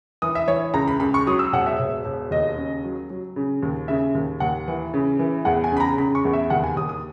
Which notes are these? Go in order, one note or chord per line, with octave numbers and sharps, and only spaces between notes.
E3 D#6
E5
E3 C#5
C#2 A#5
B5
C#2 B5
C#6
F#3 D#6
E6
E1 F#5
E5
E1
E1
D#2 D#5
C#3
F#3
F#3
C#3
D#2
C#3 E5
D#2
D#2 F#5
E3
C#3
E3
E2 F#5
G#5
C#3 B5
A#5
C#3 B5
C#6
E2
E5
D#2 F#5
G#5
D#2 D#6
D#6